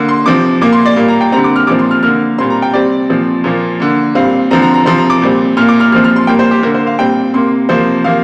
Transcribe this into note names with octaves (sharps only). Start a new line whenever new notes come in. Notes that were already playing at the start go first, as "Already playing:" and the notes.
Already playing: D3 A#3
C6
C3 F3 C4 D6
A#2 A#3 D6
C6
D5
A#2 G3 A#3
A#5
G5
D3 G3 C4 A#5
D6
F6
A#2 F3 C4 D6
C6
F6
D3 A#3 F6
A#2 G3 C4 C6
A#5
G5
C3 G3 C4 D5
A#2 F3 C4
A#2 F3 A#3
D3 A#3
A#2 G3 C4 F5
D3 F3 C4 A#5
A#5
A#5
C3 F3 C4 C6
A#5
D6
A#2 G3 C4
A#2 A#3 F6
D6
F6
A#2 F3 C4 F6
F6
C6
A#2 G3 A#3 G5
C5
G4
D3 A#3 A#4
C5
F5
A#2 G3 C4 G5
C3 A#3 C6
C3 F3 A#3 C5
C3 F3 A#3 F5